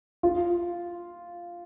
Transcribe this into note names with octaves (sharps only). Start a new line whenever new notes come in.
F4